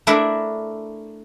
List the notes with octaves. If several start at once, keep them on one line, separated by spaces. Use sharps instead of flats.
A3 D4 E4 A#4 E5